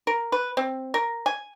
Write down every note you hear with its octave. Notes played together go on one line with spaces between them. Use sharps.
A#4
B4
C4
A#4
G#5